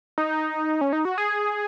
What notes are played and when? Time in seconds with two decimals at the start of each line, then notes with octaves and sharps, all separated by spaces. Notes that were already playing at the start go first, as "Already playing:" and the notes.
0.18 D#4
0.81 C#4
0.93 D#4
1.05 F#4
1.18 G#4